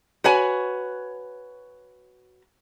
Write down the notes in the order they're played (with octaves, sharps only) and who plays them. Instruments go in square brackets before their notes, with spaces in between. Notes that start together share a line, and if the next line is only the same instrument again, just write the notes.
[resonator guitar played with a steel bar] F#4 B4 C#5 G#5